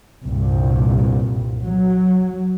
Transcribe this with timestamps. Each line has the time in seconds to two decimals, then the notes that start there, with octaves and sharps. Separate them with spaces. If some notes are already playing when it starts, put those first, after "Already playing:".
0.24 C2 G2 A#2
1.67 F#3